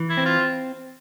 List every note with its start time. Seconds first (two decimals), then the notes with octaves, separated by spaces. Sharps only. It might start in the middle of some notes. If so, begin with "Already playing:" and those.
Already playing: E3
0.09 E4
0.17 C4
0.25 F4